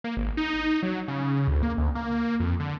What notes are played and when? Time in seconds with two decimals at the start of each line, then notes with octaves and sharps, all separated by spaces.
0.04 A#3
0.17 G#1
0.37 D#4
0.83 F#3
1.08 C#3
1.48 D2
1.63 A#3
1.78 D2
1.95 A#3
2.40 F2
2.60 D3